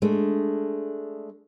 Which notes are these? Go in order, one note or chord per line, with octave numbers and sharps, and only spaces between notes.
G#3 A3 D4